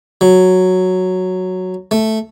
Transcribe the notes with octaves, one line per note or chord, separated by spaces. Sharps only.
F#3
A3